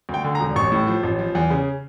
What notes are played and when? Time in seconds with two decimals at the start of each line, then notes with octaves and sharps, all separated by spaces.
0.09 D2 G5
0.24 D3
0.35 A#5
0.40 E1
0.56 A1 C#6
0.72 A2
0.87 F3
1.03 A1
1.19 F3
1.35 E2
1.50 C#3